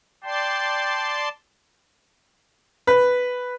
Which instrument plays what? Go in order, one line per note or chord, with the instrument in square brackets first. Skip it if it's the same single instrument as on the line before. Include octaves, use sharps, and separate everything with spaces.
[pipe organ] D5 A5 C6 [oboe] G5
[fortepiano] B4